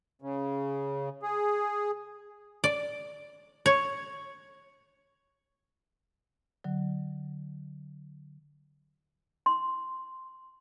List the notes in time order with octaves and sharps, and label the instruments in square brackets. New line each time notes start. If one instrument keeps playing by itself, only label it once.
[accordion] C#3
G#4
[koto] D5
C#5
[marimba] D3 F#3
[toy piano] C6